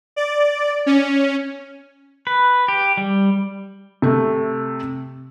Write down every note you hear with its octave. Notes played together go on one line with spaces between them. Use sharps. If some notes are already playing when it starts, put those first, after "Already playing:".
D5
C#4
B4
G4
G3
C3 A3